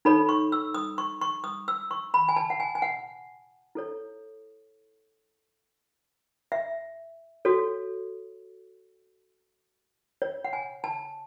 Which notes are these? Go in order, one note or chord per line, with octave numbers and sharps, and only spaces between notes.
D#4 A4 C#5 B5
C#6
E6
D#6
C#6
C#6
D#6
E6
C#6
B5
G#5
A5
F#5
G#5
G#5
F#5
E4 A4 C#5
E5
F#4 A4 C#5
C#5
F#5
G#5
A5